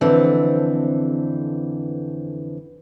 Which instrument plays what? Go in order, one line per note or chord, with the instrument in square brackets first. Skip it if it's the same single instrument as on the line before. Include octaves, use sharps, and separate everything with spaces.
[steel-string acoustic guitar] F2 D3 E3 C4